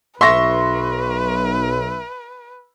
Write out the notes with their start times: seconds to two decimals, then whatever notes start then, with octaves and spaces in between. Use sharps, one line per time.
0.21 B1 B4 E5 C6 C#6 A#6